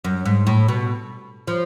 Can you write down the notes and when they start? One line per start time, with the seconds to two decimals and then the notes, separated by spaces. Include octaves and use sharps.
0.04 F#2
0.25 G#2
0.47 A2
0.68 B2
1.47 F3